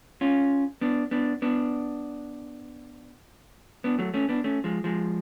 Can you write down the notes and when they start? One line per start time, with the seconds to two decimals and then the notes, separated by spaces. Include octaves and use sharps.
0.21 C#4 F4
0.81 B3 D4
1.11 B3 D4
1.42 B3 D4
3.84 B3 D4
3.99 F#3 A3
4.14 A3 C#4
4.29 B3 D4
4.44 A3 C#4
4.64 F3 G#3
4.84 F3 G#3